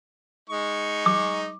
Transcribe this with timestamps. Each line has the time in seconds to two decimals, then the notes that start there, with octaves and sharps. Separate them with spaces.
0.50 G#3 D#4 C#6
1.06 D6